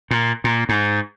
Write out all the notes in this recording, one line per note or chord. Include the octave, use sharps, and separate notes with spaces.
A#2
A#2
G#2